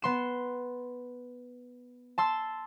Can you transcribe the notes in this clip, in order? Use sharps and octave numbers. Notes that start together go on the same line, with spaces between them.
B3 C6 E7
A5 C6 E6